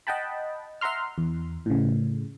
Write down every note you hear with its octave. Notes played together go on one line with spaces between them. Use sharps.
D#5 F#5 G5 A5 B5
E5 F#5 A#5 C6 F6
E2
A2 C#3